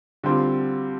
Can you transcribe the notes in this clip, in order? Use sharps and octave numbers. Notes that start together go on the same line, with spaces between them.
D3 G3 C4 F4